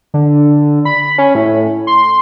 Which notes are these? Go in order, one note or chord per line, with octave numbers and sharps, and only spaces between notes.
D3
B5
C#4
A2
C6